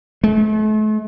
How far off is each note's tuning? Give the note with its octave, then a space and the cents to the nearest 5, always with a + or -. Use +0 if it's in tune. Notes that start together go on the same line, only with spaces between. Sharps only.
A3 -40